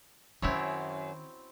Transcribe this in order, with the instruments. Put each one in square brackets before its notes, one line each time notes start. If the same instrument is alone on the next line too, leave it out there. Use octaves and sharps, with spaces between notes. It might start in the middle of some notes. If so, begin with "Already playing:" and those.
[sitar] F#2 [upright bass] D#3 C#4 [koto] C4 E4 C#5